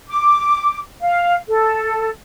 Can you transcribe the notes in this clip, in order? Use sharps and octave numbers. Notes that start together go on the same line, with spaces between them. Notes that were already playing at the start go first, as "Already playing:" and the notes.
D6
F5
A4